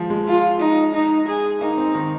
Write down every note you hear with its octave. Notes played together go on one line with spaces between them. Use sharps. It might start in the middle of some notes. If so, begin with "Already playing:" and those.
Already playing: F3 G#3
G#3
F4
D#4
D#4
G#4
A#3 D#4
C4
D#3